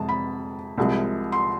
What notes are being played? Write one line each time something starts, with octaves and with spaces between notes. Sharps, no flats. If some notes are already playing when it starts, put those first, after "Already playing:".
Already playing: F2 C3 G#3 A5
B5
C2 C3 F3 G#3
C6